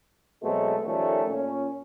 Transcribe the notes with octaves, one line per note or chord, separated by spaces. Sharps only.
B2 F#3 G#3 A3 C4
D#3 F3 G3 A3 C#4
A#2 C#4